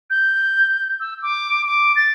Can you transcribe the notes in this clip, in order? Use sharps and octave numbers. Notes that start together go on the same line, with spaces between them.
G6
E6
D6
D6
A6